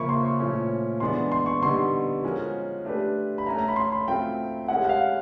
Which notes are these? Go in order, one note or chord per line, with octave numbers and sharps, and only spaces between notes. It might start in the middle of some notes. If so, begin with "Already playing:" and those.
Already playing: C#3 F3 A#3 C#4 E4 B5 C#6
C6
C#6
A#2 F3 A3 C#4
E3 G#3 B3 D4 C6
C6
C#6
D3 G3 B3 D#4 C6
F3 G#3 C#4 F#4 A#4
A3 D4 G4 B4
B5
A3 C#4 E4 A#5
A#5
B5
C6
B5
F#3 A3 C4 F4 G5
G#3 C#4 E4 G4 A#4 F#5
F#5
F5